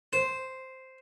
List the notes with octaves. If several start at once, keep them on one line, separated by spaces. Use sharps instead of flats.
C5